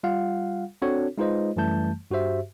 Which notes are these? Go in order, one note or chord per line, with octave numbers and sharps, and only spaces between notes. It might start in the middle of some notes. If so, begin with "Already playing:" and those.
G3 F4 F5 F#5
C4 D4 F#4 A4 C#5
G#3 D#4 F4 B4 C5 D#5
F#2 E3 G3 A3 A5 G6
G2 F#4 G4 C5 E5